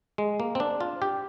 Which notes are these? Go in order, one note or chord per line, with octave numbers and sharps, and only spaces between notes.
G#3
A#3
C4
D4
F4
G4